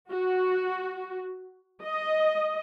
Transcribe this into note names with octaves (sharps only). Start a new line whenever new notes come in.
F#4
D#5